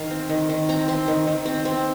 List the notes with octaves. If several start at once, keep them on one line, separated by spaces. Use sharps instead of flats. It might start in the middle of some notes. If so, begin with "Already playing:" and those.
Already playing: D#3 F5
C4
D#3
D#3
C4 A#5
C4 C6
D#3
D#3
C4
C4